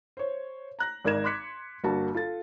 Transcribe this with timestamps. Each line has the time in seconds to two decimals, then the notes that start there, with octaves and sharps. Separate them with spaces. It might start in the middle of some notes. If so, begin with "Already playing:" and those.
0.17 C5 C#5
0.79 A#5 F#6 A#6
1.05 G#1 D#4 A#4 D5 G#6 E7
1.24 C6 D6 F#6 B6 C#7
1.83 G1 A#3 F#4 A5
2.15 F4 A4 A6